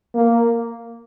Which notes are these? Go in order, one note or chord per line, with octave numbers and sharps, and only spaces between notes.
A#3